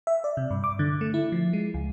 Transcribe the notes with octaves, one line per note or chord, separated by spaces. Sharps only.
E5
D5
C3
G2
D6
D3
A3
E4
F3
G#3
C#2